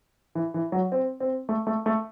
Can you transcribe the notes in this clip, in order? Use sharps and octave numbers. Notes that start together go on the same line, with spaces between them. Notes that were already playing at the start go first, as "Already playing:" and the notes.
E3
E3
F#3
C4
C4
A3
A3
A3